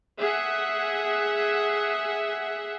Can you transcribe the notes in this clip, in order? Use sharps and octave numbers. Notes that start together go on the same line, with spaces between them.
G#4 E5 F#5